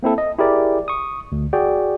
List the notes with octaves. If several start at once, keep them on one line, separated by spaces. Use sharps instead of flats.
A#3 C4 E4 A4
D#5
E4 G4 G#4 A#4 D5
C#6 D#6
D2
F#4 G#4 D5 G5